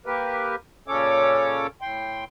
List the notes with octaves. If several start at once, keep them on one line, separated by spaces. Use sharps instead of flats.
A#3 G4 A#4 B4
A#2 C#3 C#4 A4 C#5 D6
A2 G5 C6